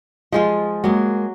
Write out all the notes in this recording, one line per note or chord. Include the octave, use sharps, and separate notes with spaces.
F3 G#3 F4 D#5
F#3 G#3 A#3